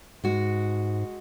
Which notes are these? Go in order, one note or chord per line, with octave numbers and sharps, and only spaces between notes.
G#2 G#3 F#4